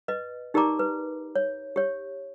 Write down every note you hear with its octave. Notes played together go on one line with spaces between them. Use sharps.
B4 D#5
D#4 G4 A#4 D5 A#5 D6
B4
C#5
G4 C#5